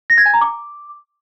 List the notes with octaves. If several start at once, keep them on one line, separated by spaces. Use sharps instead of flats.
A#6
G#6
G#5
A#5
D6